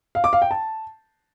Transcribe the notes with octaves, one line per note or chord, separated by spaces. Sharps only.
F5
D6
F5
G5
A5